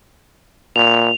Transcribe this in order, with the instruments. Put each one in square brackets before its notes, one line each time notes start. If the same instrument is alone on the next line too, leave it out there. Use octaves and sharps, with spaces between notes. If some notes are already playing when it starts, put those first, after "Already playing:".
[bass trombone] A#2 [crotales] F7